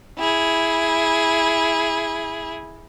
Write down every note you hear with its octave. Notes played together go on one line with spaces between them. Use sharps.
E4 G#4